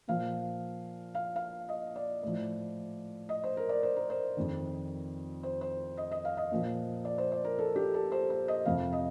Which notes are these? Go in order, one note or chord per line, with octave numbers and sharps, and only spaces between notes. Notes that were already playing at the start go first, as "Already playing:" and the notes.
A#2 F3 F5
F5
F5
D#5
D5
A2 F3
D#5
C5
A#4
D5
C5
A#4
C5
F2 D#3
C5
C5
D#5
D#5
F5
D#5
A#2 F3
D5
C5
D5
A#4
A4
G4
A4
C5
C5
D#5
F2 C3 F3 F5
D#5